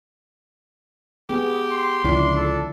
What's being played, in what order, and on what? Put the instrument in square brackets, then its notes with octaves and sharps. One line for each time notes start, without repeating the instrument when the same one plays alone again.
[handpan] B3 G#4 [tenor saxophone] G4
[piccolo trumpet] C6
[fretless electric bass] C#2 [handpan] D3 F3 E4 [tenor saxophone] D4
[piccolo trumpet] A4